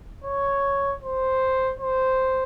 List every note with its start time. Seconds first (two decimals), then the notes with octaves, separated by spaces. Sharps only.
0.24 C#5
1.03 C5
1.80 C5